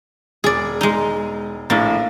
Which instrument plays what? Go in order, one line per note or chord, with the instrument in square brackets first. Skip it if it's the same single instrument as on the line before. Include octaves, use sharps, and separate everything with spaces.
[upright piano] E1 [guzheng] G#4 D5
[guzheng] G#3 D#4
[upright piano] A#1 A2 A6 [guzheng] A#3